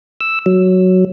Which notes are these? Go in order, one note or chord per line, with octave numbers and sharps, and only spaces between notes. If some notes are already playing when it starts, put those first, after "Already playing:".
E6
F#3